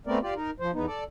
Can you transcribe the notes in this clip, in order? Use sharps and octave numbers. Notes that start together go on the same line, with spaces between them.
A3 B3 C4 A#4 D5
F4 G4 D5
D#4 A#4
F3 C5
E2 B3 D#4
A4 D5